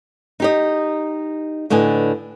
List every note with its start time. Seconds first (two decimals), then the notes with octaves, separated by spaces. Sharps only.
0.40 D#4 G4 D#5
1.70 A2 D3 B4 D#5 G#5